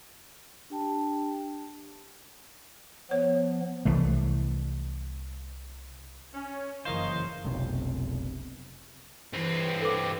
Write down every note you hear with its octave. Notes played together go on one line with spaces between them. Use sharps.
D4 G4 G5 A5
F3 B3 C#5
C2 E3 A3
C#4
F#1 E3 A#4 C5 C#5 D#5 F5
F1 B1 C3
G2 E3 C4
A4 B4 D6